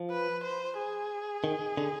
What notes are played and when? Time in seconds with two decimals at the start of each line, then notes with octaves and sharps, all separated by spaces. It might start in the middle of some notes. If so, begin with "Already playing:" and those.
Already playing: F3
0.11 B4
0.43 C5
0.77 G#4
1.44 D#3
1.77 D3